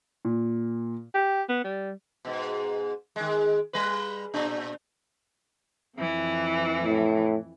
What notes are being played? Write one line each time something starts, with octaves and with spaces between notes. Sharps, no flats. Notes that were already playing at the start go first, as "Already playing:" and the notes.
A#2
G4
B3
G3
G#2 B2
D#3 G#3
G3 B4
A#2 D4
F2 E3
A2